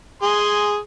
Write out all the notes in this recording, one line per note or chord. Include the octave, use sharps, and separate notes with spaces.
G#4 G#5 C6